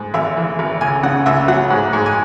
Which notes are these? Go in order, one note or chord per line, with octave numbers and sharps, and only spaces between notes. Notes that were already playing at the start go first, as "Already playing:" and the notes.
Already playing: G#2
G#1 E5
E3
G#1
C#2 G#5
C#3 F#5
C#2 E5
F#3 F#5
G#2
G#2
G#5